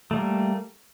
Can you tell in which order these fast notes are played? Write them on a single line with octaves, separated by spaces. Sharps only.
A3 G3 A#3